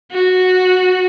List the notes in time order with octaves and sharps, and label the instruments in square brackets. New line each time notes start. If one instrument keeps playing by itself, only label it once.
[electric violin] F#4